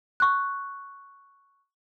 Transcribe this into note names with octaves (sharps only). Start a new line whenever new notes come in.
C#6 F#6